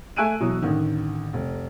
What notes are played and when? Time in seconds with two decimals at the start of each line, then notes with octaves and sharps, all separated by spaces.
0.16 A3 G#5 E6 F#6 D7 D#7
0.40 B2 E3 F#3
0.62 A1 D3 D#3
1.33 F1